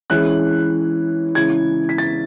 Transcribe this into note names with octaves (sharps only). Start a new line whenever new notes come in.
E3 G#3 C#4 E4 F#6
C#3 E3 G#3 C#4 E4 G#6
B6
A6